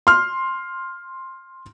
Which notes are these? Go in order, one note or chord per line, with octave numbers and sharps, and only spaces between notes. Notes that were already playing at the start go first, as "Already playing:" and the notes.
C6 F6